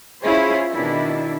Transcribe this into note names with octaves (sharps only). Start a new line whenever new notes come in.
C#4 E4 F4 G#4 C5 C#5
B2 D#3 D4 E4